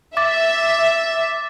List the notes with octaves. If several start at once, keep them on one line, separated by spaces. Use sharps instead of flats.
E5 D6 A6